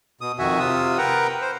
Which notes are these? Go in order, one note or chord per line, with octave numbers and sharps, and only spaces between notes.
B2 D#6
F2 D#3 F#4 E5 G#5
C3 F4 D#6 E6
A#4 B4 F#5 G5 A#5
C5